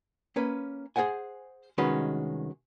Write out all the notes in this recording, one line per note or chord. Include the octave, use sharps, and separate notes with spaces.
A#3 C#4 B4
G#4 A4 C5 F#5 G#5
C2 D#3 G#3 C#4 F#4 B4